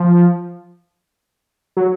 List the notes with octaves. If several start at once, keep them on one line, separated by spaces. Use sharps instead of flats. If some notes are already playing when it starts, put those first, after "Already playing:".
Already playing: F3
F#3